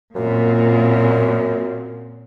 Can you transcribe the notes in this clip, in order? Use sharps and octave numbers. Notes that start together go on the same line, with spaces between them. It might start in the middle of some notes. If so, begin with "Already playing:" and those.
F#2 A#2 C4